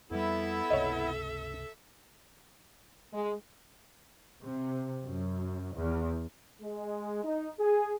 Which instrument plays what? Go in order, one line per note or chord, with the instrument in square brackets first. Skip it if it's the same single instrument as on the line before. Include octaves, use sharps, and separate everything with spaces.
[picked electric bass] F2 G3 [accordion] B3 E4 [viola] A4 E5
[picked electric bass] G1 C#2 C3 [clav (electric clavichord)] C#5 D#5
[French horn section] G#3
[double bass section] C3
F#2
E2
[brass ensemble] G#3
D#4
G#4